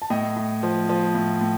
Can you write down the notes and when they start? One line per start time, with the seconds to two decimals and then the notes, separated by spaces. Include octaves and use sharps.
0.02 A5
0.10 A2 D#5 G5
0.37 A2
0.63 F3
0.89 F3
1.15 A2
1.41 A2